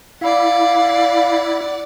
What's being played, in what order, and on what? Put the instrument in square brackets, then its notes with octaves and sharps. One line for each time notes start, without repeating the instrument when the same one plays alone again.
[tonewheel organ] E4 [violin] D5 F#5 [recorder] F5